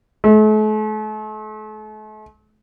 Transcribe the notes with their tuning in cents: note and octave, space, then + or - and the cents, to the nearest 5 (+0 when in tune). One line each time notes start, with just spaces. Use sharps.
A3 -40